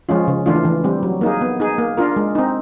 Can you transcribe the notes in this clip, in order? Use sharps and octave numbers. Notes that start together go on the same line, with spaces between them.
F3 G#3 C#4 F4
C#3
E3 A3 D4 F4
E3
G3 C4
F#3
A#3 D#4 G#4
B3
D#4 G#4
A#3
D4 F4 A#4
G#3
C4 D#4